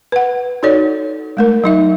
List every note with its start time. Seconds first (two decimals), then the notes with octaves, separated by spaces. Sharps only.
0.12 B4 F#5
0.63 D#4 F#4 A4 C#5 D5
1.37 G#3 A3 A#4
1.64 F#3 D#4 E5